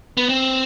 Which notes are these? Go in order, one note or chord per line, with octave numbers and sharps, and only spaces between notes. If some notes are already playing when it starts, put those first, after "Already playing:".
B3
C4